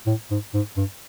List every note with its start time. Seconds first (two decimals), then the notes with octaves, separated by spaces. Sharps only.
0.07 A2
0.31 G#2
0.54 G#2
0.77 G2